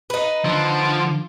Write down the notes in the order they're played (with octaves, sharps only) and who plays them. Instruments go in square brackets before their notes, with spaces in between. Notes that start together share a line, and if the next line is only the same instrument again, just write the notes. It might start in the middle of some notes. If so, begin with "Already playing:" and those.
[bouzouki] D#4 B4
[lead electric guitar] D3 [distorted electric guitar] F3